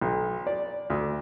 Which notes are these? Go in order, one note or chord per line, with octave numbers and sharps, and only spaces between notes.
B1
D5
D2